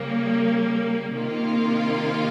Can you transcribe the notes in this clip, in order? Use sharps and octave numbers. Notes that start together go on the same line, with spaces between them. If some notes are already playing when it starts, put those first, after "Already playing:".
Already playing: C#3 G3 A#3
C3 D#3 A#3 F4